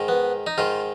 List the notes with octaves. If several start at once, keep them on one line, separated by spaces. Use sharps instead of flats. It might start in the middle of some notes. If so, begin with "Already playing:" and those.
Already playing: G#2 D#3
B3
D#4
G#2 D#3 F4